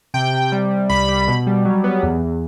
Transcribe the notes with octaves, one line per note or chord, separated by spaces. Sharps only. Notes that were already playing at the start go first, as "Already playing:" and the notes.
C3 G5
C3
G3
G3
C2 B5
G3
B2
G3
F#3
B3
E2
E2